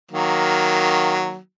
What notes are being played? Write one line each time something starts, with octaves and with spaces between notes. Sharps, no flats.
D#3 F#3 A#3